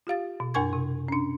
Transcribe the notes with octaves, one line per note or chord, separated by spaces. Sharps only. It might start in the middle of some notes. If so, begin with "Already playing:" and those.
F4 G4 F5 A6
B2
F#2 D4 A#4 G#5 C#6 G#6
C3
C#4 D4